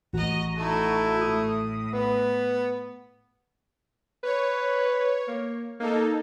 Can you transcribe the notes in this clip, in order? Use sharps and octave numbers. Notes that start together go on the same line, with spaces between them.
A1 F#4 D#5 A#5
A3 D#4 E4 A5
A2 D#6
B3 B4
B4 C#5
A#3
A#3 D#4 A4